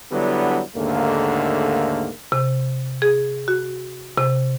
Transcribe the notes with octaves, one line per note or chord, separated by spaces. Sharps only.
D3 F#3 G3 B3 D4 E4
D#2 G#2 D3 A3 A#3
C3
G#4
F#4
C3